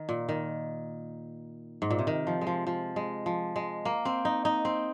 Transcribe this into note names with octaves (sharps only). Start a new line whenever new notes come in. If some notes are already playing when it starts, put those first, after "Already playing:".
Already playing: D#3
A#2
D#3
G#2
A#2
C3
D#3
F3
G#3
F3
F3
G#3
F3
G#3
A#3
C4
D#4
D#4
C4